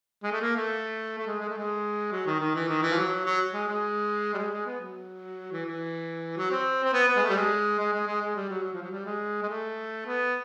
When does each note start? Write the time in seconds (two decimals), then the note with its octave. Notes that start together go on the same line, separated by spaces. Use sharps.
0.23 G#3
0.32 A3
0.41 A#3
0.56 A3
1.17 A3
1.26 G#3
1.40 G#3
1.49 A3
1.57 G#3
2.12 F#3
2.26 D#3
2.40 D#3
2.55 E3
2.68 D#3
2.82 E3
2.91 F3
2.97 F#3
3.25 F#3
3.53 G#3
3.68 G#3
4.34 G3
4.38 G#3
4.52 G#3
4.66 B3
4.80 F#3
5.52 E3
5.66 E3
6.37 F#3
6.51 C4
6.84 C4
6.93 B3
7.07 B3
7.16 G#3
7.22 A3
7.29 G3
7.36 G#3
7.79 G#3
7.93 G#3
8.07 G#3
8.21 G#3
8.36 G3
8.49 F#3
8.63 F#3
8.73 F3
8.82 F#3
8.91 G3
9.05 G#3
9.42 G#3
9.49 A3
10.06 B3